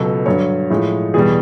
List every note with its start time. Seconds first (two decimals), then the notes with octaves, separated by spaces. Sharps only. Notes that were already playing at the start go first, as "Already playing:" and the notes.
Already playing: C#2 B2 F#3 A4
0.26 G2 D3 F#3 C#5
0.70 A2 F3 G#3
1.14 E2 B2 G3 G#4